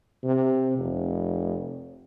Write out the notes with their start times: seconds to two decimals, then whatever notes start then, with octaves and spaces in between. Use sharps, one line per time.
0.24 C3
0.79 F1